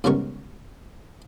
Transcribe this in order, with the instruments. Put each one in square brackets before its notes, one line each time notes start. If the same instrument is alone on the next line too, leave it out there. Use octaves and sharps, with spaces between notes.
[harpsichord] G#2 C#3 G3 B3 A#4 C#6